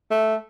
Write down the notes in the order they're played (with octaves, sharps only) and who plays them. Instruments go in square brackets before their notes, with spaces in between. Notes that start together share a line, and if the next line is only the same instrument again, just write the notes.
[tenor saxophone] A3